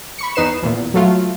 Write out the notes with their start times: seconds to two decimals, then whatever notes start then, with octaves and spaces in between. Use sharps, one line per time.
0.18 B5 C#6 C#7
0.35 E2 D#4 B4 C7 E7
0.63 E2 A#2
0.94 F#3 A3 F4